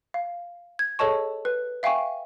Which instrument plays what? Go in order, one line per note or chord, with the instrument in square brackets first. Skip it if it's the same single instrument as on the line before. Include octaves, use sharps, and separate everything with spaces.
[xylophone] F5
G#6
G#4 A4 C#5 D#5 A5 C#6
B4
E5 F5 G5 G#5 C#6